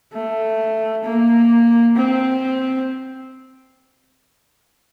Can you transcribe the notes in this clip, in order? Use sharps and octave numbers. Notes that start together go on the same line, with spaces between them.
A3
A#3
C4